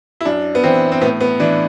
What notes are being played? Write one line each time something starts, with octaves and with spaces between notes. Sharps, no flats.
E4
F#2 D4
B3
E3 C4
C4
A2 B3
B3
E3 D4